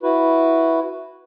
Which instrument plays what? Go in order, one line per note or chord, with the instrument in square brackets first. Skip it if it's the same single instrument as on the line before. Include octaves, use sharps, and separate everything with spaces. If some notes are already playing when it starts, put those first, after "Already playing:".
[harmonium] E4 F#4 B4